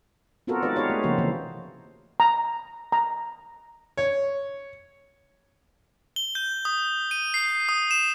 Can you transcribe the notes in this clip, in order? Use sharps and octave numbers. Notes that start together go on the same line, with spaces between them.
B3 C4 F4 F#4 A4 A#4
G#3 D#4 F4 G#4 B4 D5
D#4 G4 G#4 B4 C#5 F5
A3
C#3 F3 A#3 F#4 C5
C3 E3 A#3
A#5
A#5
C#5
G7
G6
D#6
D#7
C7
D#6
E7